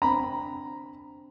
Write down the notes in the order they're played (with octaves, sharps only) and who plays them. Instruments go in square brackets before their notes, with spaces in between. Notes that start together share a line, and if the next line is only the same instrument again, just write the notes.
[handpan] C4 D4 [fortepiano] A#5 B5